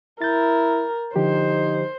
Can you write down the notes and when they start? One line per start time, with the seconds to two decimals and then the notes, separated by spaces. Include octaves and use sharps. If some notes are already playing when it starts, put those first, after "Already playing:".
0.22 E4 A#4 G6 A6
1.16 D3 F3 D#4 G4 C5